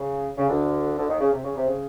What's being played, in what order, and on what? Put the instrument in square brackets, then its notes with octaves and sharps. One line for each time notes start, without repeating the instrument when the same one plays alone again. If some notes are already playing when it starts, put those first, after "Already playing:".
Already playing: [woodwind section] C#3
C#3
D2 D3
D2 D3
D#2 D#3
C#3
C3
C#3
C3
C#3